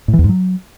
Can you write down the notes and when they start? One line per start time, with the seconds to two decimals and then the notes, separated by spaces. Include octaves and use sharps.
0.08 A2
0.13 E3
0.19 E2
0.24 G#2
0.29 F#3